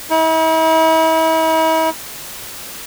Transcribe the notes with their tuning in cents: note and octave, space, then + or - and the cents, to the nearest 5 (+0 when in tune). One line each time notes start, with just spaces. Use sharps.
E4 -45